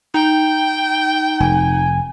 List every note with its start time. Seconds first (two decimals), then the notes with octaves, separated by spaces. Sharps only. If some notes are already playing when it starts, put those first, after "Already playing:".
0.14 D#4 G5
1.40 F1 F2 G#5